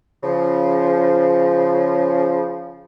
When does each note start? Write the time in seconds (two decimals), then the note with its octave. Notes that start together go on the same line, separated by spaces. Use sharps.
0.23 C#3 F3